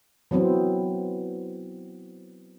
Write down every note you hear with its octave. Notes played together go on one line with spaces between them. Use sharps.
E3 F#3 B3 C4